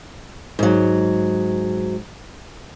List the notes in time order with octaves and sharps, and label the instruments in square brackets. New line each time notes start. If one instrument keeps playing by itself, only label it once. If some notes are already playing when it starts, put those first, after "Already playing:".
[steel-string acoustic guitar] G#2 F#3